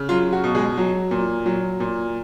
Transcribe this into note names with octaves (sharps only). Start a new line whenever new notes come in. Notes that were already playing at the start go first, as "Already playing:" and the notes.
Already playing: C#3
F#3 F4
F#4
B2
G#3 G#4
F#3
A#2
F#3
A#2